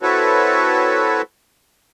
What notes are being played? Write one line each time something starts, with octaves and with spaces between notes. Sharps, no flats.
C4 E4 F#4 A4 B4 C#5